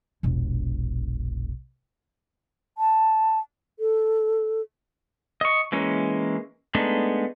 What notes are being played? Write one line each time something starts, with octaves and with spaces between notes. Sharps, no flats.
E1 A#1
A5
A4
D#5 C#6
E3 G#3 A#3 C#4
G#3 A3 B3 D4 D#4